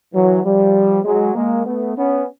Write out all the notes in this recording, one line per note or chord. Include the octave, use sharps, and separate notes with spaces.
E3 F#3
F3 G3
F#3 G#3
G#3 A#3
A3 B3
B3 C#4